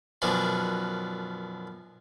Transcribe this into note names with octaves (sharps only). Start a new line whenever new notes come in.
F#2 B2 D#3 F3 D4